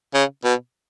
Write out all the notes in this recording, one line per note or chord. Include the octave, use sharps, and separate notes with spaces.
C#3
B2